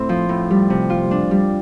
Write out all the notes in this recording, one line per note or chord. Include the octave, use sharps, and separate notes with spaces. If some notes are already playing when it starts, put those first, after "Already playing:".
Already playing: A2 C4 E4
F3
A2
G3
C3
F4
D4
G3